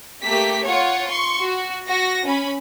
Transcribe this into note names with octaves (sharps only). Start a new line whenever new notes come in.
A3 A#3 G4 B6
F4 C#5 F#5
C6 C#6
F#4
F#4 A#6
C#4 B5